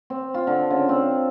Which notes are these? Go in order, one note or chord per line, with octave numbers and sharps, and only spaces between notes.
C4
F4
D3
C#3
C4